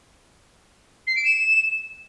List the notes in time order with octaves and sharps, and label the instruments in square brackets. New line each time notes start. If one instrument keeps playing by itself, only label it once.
[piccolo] C7
D7
E7